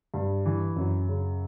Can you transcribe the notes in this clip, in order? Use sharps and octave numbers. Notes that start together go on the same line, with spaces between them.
G2
E3
F#2
C#3